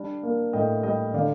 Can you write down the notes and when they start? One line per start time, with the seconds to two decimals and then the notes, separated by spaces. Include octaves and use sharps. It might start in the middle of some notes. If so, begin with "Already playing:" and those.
Already playing: G3 D4
0.23 A#3
0.53 A2 D#5 G5
0.83 G3 D#5 G5
1.14 D3 D5 F5